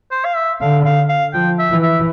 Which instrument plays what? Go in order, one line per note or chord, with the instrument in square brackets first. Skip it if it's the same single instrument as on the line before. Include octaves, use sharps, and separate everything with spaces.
[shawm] C5
F5
E5
[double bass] D3 [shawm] F5
[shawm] F5
F5
[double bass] F3 [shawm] G5
[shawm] E5
[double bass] E3
[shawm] E5